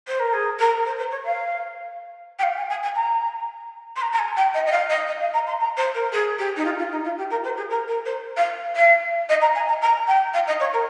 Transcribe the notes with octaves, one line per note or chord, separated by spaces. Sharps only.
C5
A#4
G#4
A#4
C5
C5
C#5
F5
G5
F5
G#5
G#5
G#5
A#5
C6
A#5
A#5
G#5
G5
D#5
D#5
F5
D#5
D#5
F5
A#5
C6
A#5
C5
A#4
G#4
G4
D#4
F4
F4
D#4
F4
G4
A#4
C5
G#4
A#4
A#4
C5
F5
F5
D#5
A#5
G#5
A#5
A#5
G5
F5
D#5
C#5
A#4